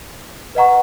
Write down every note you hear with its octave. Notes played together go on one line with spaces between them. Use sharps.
B4 D#5 F#5 A#5 C#6